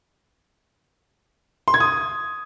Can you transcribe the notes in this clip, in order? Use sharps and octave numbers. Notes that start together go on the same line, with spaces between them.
C6
G#6
D#6